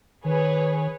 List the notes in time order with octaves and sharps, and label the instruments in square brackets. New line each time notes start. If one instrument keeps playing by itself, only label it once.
[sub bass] D#3 [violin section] G#4 B4 C#5